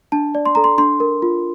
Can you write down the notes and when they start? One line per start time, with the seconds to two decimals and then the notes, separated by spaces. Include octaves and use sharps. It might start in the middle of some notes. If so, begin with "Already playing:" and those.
0.12 D4 A5
0.35 D5
0.46 C6
0.55 A4 A#5
0.64 C6
0.78 D4 C6
1.00 A#4
1.22 F4